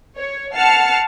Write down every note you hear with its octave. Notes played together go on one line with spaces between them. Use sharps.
C#5
F#5 A5 F6 C7 C#7